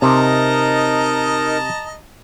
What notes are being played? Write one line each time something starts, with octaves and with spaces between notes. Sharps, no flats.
C3 D#4 A#4 D#5 A5 A#5